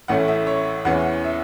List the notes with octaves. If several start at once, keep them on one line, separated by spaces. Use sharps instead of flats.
A1 A2 A3 C#4 F#5
E5
C#5
E2 E3 C#4 F#5
E5